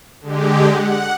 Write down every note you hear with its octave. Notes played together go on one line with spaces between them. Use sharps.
D3 G#3 G4
F#5